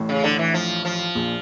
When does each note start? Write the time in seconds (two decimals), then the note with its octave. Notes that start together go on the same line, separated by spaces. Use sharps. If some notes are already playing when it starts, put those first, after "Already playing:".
Already playing: A1 A2
0.09 C#3
0.24 D3
0.39 E3
0.54 F3
0.85 F3
1.15 A#1 A#2